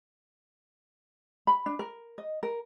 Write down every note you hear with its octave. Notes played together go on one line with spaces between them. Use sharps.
B5
D4
A#4
D#5
A#4